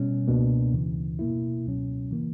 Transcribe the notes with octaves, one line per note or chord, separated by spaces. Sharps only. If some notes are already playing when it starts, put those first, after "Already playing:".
Already playing: B2 G3 C#4
C#2 B2 A#3 D4
D2 C#3 E3
B2 A#3 E4
C#2 B2 F#3 C#4
C#3 E3 A#3